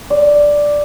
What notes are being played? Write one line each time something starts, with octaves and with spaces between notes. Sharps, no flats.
D5